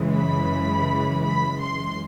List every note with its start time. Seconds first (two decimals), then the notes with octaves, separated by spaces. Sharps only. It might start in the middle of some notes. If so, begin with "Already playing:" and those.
Already playing: F#2 C#3 E3 G#3
0.13 B5
1.23 B5
1.61 C6